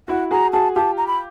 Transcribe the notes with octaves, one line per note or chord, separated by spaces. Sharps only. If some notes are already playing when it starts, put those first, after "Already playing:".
E4 F#4 F#5
F#4 G#4 A#5
F#4 G#4 A5
F4 G4 A5
A#5
B5